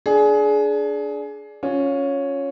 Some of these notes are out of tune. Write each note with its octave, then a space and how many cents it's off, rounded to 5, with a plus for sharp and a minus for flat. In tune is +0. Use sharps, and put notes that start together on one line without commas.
D4 -10 G#4 +20
C#4 +0 F4 +30